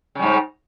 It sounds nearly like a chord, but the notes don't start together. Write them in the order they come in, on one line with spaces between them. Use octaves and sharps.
C#3 G3 G#2